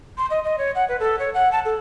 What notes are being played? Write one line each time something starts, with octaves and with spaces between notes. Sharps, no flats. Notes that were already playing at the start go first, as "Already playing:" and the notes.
C6
D#5
D#5
C#5
F#5
B4
A4
C#5
F#5
A5
A4